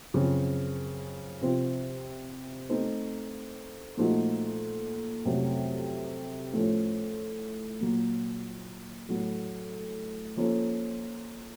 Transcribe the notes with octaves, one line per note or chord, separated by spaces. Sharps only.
F#2 C#3 F3 C4
C3 F3 C4 F4
A3 C4 D#4 A4 C5
A#2 F3 A3 D#4 F#4
F2 C3 F#3 A3 C#4
A2 F3 A3 C#4
A#2 F#3 A#3
A2 F#3 A3
F3 A#3 C#4 A4